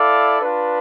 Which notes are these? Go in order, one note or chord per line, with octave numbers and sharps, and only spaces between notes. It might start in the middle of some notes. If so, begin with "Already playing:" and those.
Already playing: E4 A4 D5 F5
D4 F4 B4